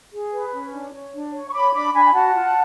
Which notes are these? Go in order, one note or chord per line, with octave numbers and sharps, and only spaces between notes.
G#4
B4
C#4
D4
C#5
D4
C#5
C#6
C#5 B5 D6
D4 B5 D6
D4 G#5 B5
G#5
F#4 F#5 A5
F4